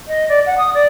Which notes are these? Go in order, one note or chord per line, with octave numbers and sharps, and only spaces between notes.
D#5
D5
F#5
D#6
D5